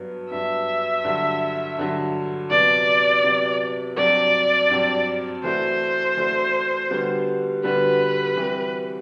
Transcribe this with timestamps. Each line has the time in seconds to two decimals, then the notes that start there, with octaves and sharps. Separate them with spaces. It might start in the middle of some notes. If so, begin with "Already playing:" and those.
Already playing: G2 F#3 B3
0.30 G2 F#3 B3 E5
1.04 G2 D3 F#3
1.77 G2 D3 F#3
2.50 C3 F#3 B3 D5
3.24 C3 F#3 B3
3.97 G2 F#3 C4 D5
4.70 G2 F#3 C4
5.44 E3 A3 D4 F#4 C5
6.17 E3 A3 D4 F#4
6.90 D3 G3 B3 F#4
7.64 D3 G3 B3 F#4 B4
8.37 E3 G3 C4 F#4